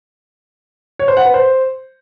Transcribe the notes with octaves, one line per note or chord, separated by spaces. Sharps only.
C#5
C5
F#5
B4
C5